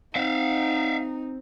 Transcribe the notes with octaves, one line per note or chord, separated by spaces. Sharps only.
C4 D#4 E5 F5